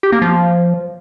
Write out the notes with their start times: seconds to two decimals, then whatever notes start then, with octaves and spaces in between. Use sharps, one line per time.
0.03 G4
0.12 A#3
0.22 F3